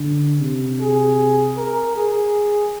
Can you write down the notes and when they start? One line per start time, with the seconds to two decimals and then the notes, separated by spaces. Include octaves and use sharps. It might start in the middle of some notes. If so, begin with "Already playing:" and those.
Already playing: D3
0.41 C3
0.81 G#4
1.57 A#4
1.96 G#4